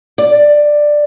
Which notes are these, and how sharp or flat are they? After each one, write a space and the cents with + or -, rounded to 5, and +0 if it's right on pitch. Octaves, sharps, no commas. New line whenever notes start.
D5 +10